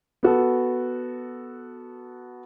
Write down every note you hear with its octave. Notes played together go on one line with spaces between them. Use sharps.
B3 F#4 A4